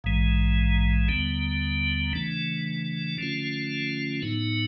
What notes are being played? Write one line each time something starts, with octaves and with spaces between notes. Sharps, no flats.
A#1 G#2 E3 G#3
D#2 D3 G3 B3
C#3 E3 A3 D4
D3 F3 A3 C#4 F4
A2 F#3 B3 D#4